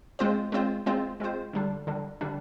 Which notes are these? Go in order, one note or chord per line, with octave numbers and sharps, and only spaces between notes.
G#3 C4 F4 C5
G#3 C4 F4 C5
G#3 C4 F4 C5
G#3 C4 F4 C5
D3 G3 D4
D3 G3 D4
D3 G3 D4